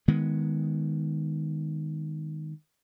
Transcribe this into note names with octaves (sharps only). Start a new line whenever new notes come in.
D#3 G#3 B3